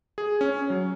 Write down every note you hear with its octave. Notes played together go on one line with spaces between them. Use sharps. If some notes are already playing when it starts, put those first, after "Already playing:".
G#4
C#4
F#3